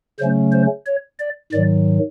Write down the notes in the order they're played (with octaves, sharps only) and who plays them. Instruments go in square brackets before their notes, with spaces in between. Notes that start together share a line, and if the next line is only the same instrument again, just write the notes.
[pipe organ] C#3 F#3 A3 C#4 C5
C5
C#5
D5
G#2 D#3 F#3 D5